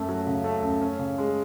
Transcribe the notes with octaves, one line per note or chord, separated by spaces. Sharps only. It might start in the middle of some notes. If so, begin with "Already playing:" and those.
Already playing: F#2 A3
F#3
C#3
A3
F#2
C#4
C#3
G#3